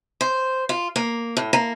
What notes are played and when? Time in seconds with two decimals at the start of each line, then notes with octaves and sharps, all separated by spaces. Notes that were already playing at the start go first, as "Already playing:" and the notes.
0.21 C5
0.69 F4
0.96 A#3
1.37 A2
1.53 A#3